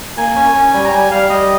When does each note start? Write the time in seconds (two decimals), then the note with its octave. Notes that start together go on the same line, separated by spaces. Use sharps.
0.17 A#3 G#5
0.36 C#4
0.55 C#4
0.74 G3
0.85 A#5
0.92 G3 G#5
1.11 G3 F5
1.30 G3 D#5